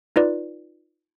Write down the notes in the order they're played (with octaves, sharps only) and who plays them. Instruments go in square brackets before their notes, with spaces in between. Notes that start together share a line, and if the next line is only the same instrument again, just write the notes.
[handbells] D#4 F4 B4 D5